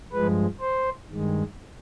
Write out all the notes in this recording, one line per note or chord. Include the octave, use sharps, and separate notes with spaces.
G2 F3 G#3 B4
C5
G2 D#3 G#3